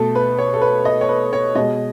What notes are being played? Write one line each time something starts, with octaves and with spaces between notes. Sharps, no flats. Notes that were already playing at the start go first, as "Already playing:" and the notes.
Already playing: B2 A3 A4
B4
C#5
A4
B4
D#5
C#5
B4
C#5
B2 G#3 D#5